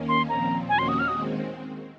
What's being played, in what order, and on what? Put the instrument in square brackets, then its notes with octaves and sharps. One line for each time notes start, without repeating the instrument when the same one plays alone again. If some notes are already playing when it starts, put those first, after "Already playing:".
Already playing: [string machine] D#2 D#3 A#3 C#4
[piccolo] C6
[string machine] A#2 F3 C4 [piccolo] A#5
[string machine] D#2 D#3 A#3 C#4 F#4 [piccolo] G#5
[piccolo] C6
D#6
F6
[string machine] D#3 G#3 C4 [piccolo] D#6